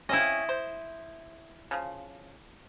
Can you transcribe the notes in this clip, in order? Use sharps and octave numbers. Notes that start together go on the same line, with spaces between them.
C#3 C4 C#4 E4 D#5
C5
C#3 F3